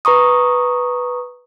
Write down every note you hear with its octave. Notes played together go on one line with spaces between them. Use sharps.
B4 A#5 C#6 D#6